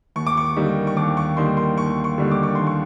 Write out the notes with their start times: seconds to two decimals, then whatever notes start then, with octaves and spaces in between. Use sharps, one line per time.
0.16 D#2 C#6
0.27 D6
0.37 C#6
0.56 D3 G3 A#3 D#4
0.87 C#6
0.96 D#2 D6
1.17 C#6
1.37 D3 G3 A#3 D#4 C6
1.57 C6
1.78 D#2 C#6
2.04 C#6
2.18 D3 G3 A#3 D#4
2.32 D6
2.43 C#6
2.55 D#2 C6
2.67 C#6